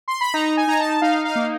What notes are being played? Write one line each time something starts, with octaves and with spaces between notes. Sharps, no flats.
C6
B5
D#4 A#5
G#5
D#4 A#5
A5
D#4 F5
F5
A#3